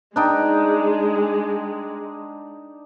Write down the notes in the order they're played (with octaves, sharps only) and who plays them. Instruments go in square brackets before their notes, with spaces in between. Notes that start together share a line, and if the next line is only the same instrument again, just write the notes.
[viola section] G#3 [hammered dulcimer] D4 D#4 G5